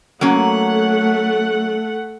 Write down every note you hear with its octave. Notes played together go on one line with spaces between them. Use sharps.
F#3 A3 A#3 C#4 F#5